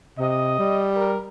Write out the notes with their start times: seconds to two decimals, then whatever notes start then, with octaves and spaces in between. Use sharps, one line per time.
0.19 C3 D#5
0.59 G3
0.96 A#4